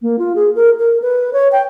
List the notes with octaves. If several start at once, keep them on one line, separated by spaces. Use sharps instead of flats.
A#3
F4
G#4
A#4
A#4
B4
C#5
G5